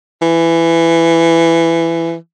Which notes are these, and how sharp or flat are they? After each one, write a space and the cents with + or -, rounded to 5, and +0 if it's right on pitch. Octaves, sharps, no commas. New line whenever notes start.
E3 +15